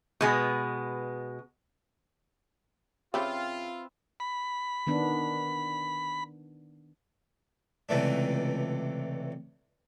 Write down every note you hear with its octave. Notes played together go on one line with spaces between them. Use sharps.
B2 G#3 B3
C#3 C4 F4 G4 B4 E5
B5
D#3 B3 D4
C#2 C3 E3 A3 D4